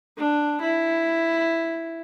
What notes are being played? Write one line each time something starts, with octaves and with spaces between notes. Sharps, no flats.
D4
E4